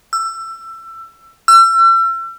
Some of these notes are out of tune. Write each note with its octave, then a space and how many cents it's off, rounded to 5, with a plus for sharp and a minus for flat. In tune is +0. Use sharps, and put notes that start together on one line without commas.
E6 +25
E6 +40